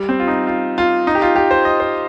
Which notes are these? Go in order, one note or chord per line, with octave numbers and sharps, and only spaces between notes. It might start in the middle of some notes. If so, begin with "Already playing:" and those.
Already playing: G3
C4
F4
D#4
F4
F4
D#4
G4
F4
G4
C5
D#5
C5